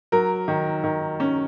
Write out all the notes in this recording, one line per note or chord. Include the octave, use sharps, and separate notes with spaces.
F#3 A#4
D#3
D#3
C#4